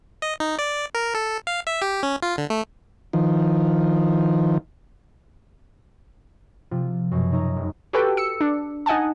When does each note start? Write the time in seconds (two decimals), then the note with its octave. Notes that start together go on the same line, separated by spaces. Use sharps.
0.22 D#5
0.40 D#4
0.59 D5
0.95 A#4
1.15 A4
1.47 F5
1.67 E5
1.82 G4
2.03 C#4
2.23 F4
2.38 D3
2.50 A3
3.13 D#3 F3
6.71 C3 F3 F4
7.12 F#2 B2
7.32 D#4 C#5 D#5 E5 A#5
7.57 F1
7.93 F#4 G4 A4 B4 G5
8.17 E6 C#7
8.41 D4
8.86 D#4 D#5 F#5 G#5 A5